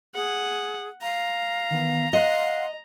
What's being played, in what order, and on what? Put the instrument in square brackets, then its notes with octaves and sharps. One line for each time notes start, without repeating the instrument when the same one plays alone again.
[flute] G#4 [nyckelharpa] F#5
[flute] F5 [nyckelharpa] A#5
[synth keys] D#3 E3 B3
[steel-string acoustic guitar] D#5 [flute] F5 [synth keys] F#5 C6 F#6